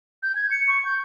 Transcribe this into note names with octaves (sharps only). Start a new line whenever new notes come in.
G6
G#6
C#7
C#6
G6